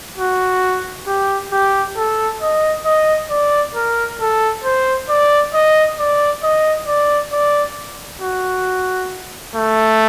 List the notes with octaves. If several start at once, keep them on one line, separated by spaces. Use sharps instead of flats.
F#4
G4
G4
A4
D#5
D#5
D5
A#4
A4
C5
D5
D#5
D5
D#5
D5
D5
F#4
A3